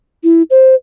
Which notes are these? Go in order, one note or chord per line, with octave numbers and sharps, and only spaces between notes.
E4
C5